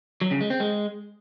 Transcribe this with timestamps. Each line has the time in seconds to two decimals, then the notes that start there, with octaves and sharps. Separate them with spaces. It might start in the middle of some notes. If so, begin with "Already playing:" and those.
0.21 F#3
0.31 C#3
0.41 G#3
0.50 C4
0.60 G#3